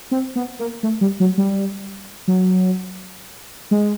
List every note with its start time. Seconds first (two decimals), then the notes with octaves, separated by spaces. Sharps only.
0.11 C4
0.36 B3
0.59 A#3
0.83 A3
1.01 G3
1.20 F#3
1.38 G3
2.28 F#3
3.71 G#3